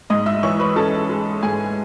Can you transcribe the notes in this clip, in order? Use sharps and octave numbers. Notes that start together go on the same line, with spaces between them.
G#2 D#5 D#6
E5 E6
E3 C#5 C#6
B4 B5
C#4 A4 A5
G#3
G#2 G#4 G#5